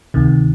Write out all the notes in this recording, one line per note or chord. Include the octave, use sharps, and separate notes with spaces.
D2 C3 D#3